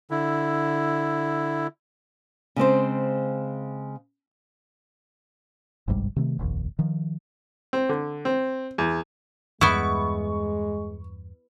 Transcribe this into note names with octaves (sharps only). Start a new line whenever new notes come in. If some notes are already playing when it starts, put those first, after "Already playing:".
D3 E4
C#3 G#3 C4 C5
G1 C2 G#2 G3
C3 D#3 A3
F1 A#1 D#2
D#3 F3
C4
D3
C4
E2
E2 G2 G#3 B3 E4 C#6